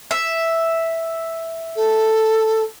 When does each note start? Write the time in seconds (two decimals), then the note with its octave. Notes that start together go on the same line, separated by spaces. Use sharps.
0.11 E5
1.76 A4